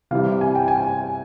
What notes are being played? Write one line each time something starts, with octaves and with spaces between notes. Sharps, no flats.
C3 E3 G3 F5
G#5
G5
G#5